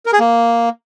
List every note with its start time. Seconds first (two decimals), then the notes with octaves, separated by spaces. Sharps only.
0.06 A#4
0.13 G#4
0.19 A#3